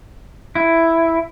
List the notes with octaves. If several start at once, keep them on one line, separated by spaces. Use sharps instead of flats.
E4